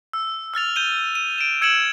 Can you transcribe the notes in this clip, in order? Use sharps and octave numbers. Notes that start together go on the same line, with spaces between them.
E6
E6 F6 A6 F7
G6 D#7 G7
D#7
D7 E7
E6 G#6 C#7 D7 E7 F#7